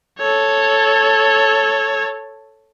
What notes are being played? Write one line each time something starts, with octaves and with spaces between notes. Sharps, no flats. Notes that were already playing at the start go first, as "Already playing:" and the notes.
A4 C#5